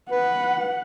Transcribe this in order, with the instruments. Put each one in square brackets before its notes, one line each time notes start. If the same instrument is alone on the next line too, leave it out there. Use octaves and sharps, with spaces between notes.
[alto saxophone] B4 [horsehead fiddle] F#5